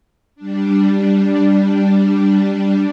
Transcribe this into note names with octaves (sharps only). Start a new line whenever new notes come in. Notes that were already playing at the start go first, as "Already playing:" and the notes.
G3 D4